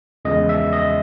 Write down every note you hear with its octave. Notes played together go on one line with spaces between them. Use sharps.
E2 C#3 F3 G#3 D#5
E5
D#5